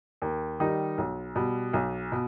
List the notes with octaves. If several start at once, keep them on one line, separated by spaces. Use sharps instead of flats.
D#2
D#3 G3 D#4
B1
B2 G3
B1
B2